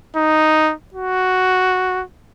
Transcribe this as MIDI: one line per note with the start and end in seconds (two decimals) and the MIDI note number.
0.16 0.73 63
0.94 2.04 66